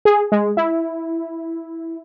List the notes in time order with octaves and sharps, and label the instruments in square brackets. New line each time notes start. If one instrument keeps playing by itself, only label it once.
[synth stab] G#4
G#3
E4